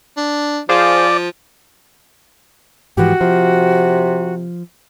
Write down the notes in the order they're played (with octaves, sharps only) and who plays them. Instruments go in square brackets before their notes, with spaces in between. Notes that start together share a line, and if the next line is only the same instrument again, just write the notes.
[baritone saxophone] D4
[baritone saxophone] F3 [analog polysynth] G#4 C5 F5 [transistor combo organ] D5
[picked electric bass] G#2 E3 F3 [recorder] F#4 [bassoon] G4
[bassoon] C3 [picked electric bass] F3